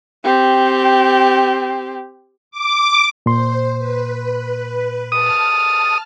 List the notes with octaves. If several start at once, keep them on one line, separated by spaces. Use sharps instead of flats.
C4 G4
D6
A#2 C5 C6
B4
A5 D#6 F6